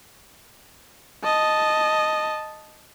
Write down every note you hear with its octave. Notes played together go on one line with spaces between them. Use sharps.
D#5 A5